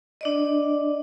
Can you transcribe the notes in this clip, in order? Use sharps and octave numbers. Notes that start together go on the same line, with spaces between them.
D4 D5 D#5